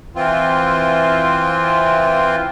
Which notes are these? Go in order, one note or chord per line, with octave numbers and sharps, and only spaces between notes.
E3 C4 F4